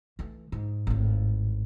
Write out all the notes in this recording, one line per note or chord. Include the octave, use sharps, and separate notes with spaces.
E3 A3
G#2
G#1 A2